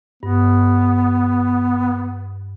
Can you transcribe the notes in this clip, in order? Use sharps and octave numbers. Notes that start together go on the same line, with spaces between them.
G2 B3